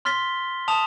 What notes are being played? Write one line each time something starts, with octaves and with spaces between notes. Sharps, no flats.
C6 F6 A6 B6 G7
A5 D#6 F7